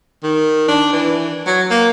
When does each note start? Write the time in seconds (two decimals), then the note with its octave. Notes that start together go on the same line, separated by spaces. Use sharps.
0.23 D#3
0.68 D4
0.93 E3
1.47 F#3
1.71 A#3